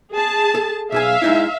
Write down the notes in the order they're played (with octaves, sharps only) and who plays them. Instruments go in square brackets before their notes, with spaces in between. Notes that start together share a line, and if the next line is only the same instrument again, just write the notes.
[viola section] G#4 A5
[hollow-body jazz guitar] A4
[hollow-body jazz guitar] B1 G#4 G#5 [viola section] E5 F5
[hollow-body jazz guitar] G#3 D#4 E4